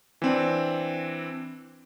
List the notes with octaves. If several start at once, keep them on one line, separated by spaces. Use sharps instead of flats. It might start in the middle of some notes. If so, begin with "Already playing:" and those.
E3 C4 D4